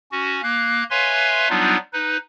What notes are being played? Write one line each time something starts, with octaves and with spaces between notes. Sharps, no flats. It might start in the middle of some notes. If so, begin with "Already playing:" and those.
C#4 F#4
A#3 F5 F#6
B4 C#5 E5 F5 G#5 C6
F#3 G3 B3 D4 D#4 F4
D#4 B4